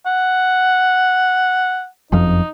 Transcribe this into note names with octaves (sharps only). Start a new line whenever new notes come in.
F#5
F#1 F2 F3 D#4